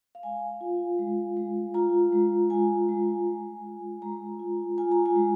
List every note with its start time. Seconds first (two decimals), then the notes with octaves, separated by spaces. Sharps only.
0.15 F5
0.23 G#3 G#5
0.61 F4
0.99 G#3
1.37 G#3
1.74 F4 A#5
2.12 G#3
2.50 G#3 G#5
2.89 G#3
3.27 G#3
3.65 F4
4.02 G#3 A#5
4.39 F4
4.78 F4 G#5
4.91 A#5
5.06 G#5
5.16 G#3